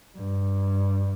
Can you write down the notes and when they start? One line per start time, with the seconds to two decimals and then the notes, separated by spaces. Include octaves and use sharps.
0.17 G2